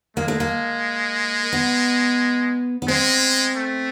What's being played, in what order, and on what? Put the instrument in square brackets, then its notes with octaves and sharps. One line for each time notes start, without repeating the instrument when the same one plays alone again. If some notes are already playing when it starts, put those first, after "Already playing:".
[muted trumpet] G#3 [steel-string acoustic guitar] A#3
[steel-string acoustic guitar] A3
A#3
B3
B3
[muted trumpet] G#3 [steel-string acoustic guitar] C4
[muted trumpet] A3